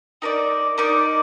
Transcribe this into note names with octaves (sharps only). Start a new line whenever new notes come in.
D#4 A#4 D5
D#4 A#4 D5